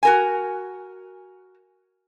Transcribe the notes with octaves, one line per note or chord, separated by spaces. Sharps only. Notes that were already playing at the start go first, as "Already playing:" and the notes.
F#4 A#4 G#5